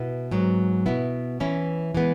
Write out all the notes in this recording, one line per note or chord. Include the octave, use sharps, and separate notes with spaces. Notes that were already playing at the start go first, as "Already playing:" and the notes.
Already playing: B2 B3 E4
G#2 F#3 B3
B2 B3 E4
E3 C#4 E4
E3 G#3 B3